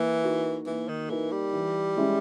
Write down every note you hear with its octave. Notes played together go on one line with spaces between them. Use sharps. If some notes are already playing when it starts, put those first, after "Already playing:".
Already playing: E3 A#3
D#4 F#4 A#4
E3 A#3
D#3
E3 D#4 F#4 A#4
G3
E3
G#3 C#4 E4